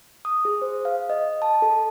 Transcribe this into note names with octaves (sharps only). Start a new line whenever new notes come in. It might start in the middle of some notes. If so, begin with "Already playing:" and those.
D#6
G#4
C5
F5
D#5
A5
A4